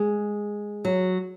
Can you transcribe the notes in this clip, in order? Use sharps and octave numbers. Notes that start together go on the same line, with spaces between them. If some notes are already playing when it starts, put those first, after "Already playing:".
Already playing: G#3
F#3